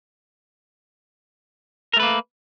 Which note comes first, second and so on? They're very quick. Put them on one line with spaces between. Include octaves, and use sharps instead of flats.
A#4 A3 B4 A#3